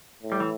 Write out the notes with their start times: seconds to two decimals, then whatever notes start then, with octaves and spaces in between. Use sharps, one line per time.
0.23 A2
0.32 G3
0.40 E3